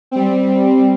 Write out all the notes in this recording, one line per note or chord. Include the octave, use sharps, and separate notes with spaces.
G3 C4